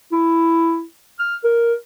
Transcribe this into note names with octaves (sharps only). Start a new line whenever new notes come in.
E4
F6
A#4